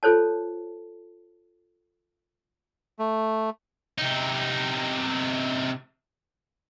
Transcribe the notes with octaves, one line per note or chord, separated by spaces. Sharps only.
F4 A4 C5 C#5 A5
A3
C3 D#4